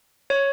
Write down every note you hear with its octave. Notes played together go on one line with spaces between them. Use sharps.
C#5